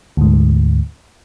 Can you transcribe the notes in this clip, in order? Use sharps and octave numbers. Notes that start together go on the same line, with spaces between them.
D2 G#2